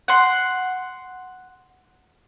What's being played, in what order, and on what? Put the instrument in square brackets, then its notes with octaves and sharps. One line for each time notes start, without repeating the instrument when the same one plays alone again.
[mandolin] F#5 C6